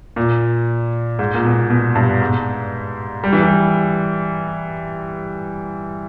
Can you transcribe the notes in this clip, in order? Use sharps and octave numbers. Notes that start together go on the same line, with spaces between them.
A#2
G#2
A#2
B2
B2
G2
G#2
G3
E3
G3